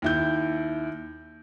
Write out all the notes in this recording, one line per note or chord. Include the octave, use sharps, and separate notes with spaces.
D#2 E4 G6